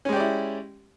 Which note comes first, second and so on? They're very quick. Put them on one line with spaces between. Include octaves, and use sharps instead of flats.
C#4 G#3 G4 D5 E4